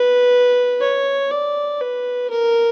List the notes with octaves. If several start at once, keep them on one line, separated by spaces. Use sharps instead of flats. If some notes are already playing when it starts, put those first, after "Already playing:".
Already playing: B4
C#5
D5
B4
A#4